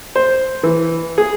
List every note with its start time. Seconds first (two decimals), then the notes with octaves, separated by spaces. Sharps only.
0.16 C5
0.63 E3
1.18 G#4